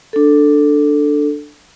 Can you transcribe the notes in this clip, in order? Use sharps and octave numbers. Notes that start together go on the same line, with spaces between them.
D4 A4